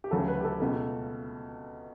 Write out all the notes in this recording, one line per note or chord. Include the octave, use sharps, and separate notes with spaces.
G4
D2 C#3 F#3 A3 A4
B4
G4
A4
C#2 B2 A3